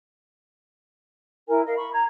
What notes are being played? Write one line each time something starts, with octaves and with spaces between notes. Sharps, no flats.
E4 A#4 G#5
A#4 D#5 F5
B5 C#6
A#5 G#6